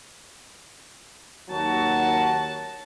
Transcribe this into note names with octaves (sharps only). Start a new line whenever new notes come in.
D#2 F#3 F#4 A5